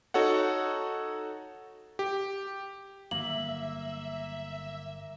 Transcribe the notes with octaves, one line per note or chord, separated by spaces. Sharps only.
D#4 F#4 A4 C#5 F#5
G4
G1 D#3 F#3 A#3 E5 F#7